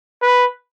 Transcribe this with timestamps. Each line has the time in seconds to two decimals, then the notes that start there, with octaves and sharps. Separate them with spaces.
0.22 B4